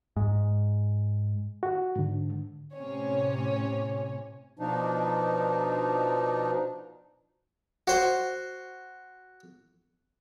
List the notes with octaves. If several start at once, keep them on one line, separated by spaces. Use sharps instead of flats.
G#2
F#4
G#2 D3
A2 C3 C#4 C#5
B2 F3 D4 D#4
F#4 C5